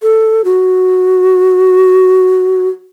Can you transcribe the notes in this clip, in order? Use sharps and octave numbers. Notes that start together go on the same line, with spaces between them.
A4
F#4